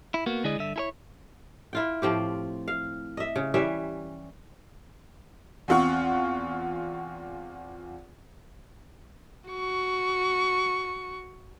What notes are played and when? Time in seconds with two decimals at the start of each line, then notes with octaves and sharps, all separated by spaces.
0.14 E4
0.26 A#3 B3 F#4
0.44 D3 G#3 E4 G#4 D5 D#5
0.58 G2 D3 E5
0.76 E4 A4 C#5
1.73 E4 F4 G5
2.02 A2 F3 C4 G4
2.68 F5
3.17 D#5 E5
3.36 C#3
3.54 E3 G3 C#4 E5
5.68 E2 C4 F4 F#5 C#6
9.50 F#4 C#6